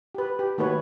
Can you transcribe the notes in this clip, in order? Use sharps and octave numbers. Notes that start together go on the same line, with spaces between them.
G4 B4
G4
D#3 A3 A#3 F#4 B4 C#5